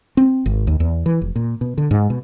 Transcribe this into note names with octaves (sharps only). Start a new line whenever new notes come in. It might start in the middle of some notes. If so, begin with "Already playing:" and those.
C4
G#1
D#2
E2
E3
F1
A#2
B2
D3
G#2
B2